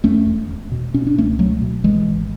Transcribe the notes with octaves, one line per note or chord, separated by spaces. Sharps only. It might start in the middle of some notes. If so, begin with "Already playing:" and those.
E2 A3 C#4
E1
E1
B2
B2 C#4
D4
C#2 A3 C#4
B2 F#3 A3
B2
G#1 E3 G#3
G#1